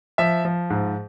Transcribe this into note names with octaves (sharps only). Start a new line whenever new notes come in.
F3 E5
F3
G#2